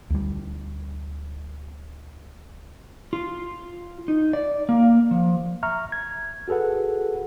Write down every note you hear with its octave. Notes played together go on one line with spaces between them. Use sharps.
D2 G3
F4
D#4
D5
A#3
F3
E5 A#5 C#6 F6
G#6
F#4 G#4 A4 B4 F#5